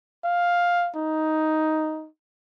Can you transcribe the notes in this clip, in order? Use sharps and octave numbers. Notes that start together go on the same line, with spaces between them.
F5
D#4